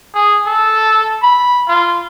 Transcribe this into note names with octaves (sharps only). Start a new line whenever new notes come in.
G#4
A4
B5
F4